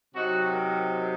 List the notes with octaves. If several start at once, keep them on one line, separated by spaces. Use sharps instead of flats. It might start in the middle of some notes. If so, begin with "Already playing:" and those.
C3 F#3 C4 D#4 F#4
A#4